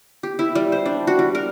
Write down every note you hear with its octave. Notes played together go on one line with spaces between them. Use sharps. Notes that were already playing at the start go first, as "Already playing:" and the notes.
G4
E4
G3
C5
D4
F#4
G3
A#4